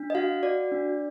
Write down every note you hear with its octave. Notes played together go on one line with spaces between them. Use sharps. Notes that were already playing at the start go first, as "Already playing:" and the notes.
Already playing: D4
D#5
F#4 F5
F#4 D5
D4